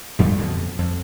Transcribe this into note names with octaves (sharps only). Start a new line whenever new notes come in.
B1 F2 G3 A3
F2 B2 D3
F2